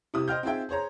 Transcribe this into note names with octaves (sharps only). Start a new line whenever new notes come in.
C3 E4 D#6
C5 D#5 G5 F6 G6
C4 D#4 F4 G#4 E5 G5
G#4 C5 C#5 A#5